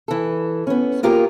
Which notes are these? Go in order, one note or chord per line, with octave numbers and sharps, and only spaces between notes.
E3 A4
B3 C#4
A#3 F4 G4 G#4 A#4